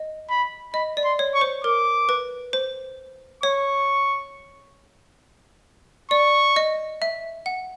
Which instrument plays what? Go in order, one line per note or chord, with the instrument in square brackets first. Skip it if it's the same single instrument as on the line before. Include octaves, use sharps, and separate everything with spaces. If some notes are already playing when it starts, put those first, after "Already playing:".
Already playing: [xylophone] D#5
[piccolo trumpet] B5
[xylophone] D#5 [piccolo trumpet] B5
[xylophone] D5
[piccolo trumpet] C6
[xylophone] C#5
[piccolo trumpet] C#6
[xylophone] C5
[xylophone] A#4 [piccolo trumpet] D6
[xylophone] B4
C5
[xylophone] C#5 [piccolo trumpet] C#6
[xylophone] D5 [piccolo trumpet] C#6
[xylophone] D#5
E5
F#5